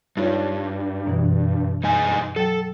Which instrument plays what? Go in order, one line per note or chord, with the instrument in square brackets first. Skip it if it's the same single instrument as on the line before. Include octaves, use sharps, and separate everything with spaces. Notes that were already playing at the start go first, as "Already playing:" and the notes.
[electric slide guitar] G2 [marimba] D#4 F4 C#5
[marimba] F#2 B2 E3
[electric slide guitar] G2 D#4 G#5
[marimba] F#3 G5 [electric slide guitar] A4